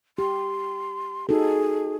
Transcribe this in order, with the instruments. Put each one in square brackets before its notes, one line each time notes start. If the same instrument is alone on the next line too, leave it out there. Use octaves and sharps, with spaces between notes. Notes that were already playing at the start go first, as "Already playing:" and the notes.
[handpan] G4 [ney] C6
[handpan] D#4 F#4 A4 [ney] G#4